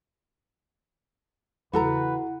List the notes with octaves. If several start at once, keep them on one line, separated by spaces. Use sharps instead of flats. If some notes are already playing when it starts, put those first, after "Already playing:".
E2 C#3 E4 F#4 A4 B4 F#5 A#5